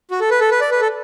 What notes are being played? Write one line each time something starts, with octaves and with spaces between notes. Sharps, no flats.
F#4
A4
B4
A4
B4
D5
B4
A4